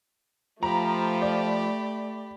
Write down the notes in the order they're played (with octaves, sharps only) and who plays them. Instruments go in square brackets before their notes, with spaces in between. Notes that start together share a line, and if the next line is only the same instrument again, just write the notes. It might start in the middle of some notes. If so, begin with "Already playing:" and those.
[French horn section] F3 [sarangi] A3 [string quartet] G4 B5 [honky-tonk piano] A#5
[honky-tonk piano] D5